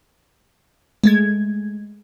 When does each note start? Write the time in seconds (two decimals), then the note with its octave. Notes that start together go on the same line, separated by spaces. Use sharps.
1.04 G#3 A3 G#6